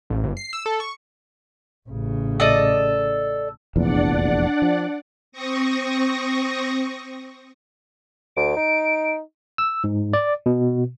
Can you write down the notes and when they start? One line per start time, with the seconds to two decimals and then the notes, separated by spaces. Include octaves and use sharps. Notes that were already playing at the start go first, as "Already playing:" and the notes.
0.10 A1
0.24 G1
0.37 C7
0.53 E6
0.66 A4
0.80 C#6
1.89 A1 C#3
2.40 A4 D5 D#5
3.76 F1 A#1 E2 D4 D5 F#5
4.62 F3
5.32 C4 C#6 D#6 A#6
8.36 D2 D7
8.56 D#4
9.58 E6
9.84 G#2
10.13 D5
10.46 B2